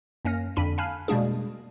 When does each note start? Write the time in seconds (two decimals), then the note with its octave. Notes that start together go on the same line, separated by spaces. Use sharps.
0.25 F#2 A#3 C#4 F6 A#6
0.56 F2 D3 D4 B5 B6 D#7
0.78 F5 G#5 A5 B5 F6 F#6
1.08 B2 G3 G#3 A#3 D4 G#4